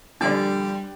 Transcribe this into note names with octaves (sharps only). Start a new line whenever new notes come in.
A#2 D3 F3 G3 D4 G4 B4 D5